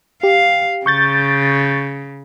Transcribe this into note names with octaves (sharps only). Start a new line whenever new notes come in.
G4 F5
C#3 C#6 G6 A6